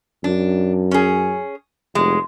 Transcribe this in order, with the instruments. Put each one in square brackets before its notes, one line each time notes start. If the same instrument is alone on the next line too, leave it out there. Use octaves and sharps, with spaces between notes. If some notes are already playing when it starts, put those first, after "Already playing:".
[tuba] F#2 [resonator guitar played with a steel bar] D4
[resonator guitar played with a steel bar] C#4 G#4
[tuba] F1 [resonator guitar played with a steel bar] G#3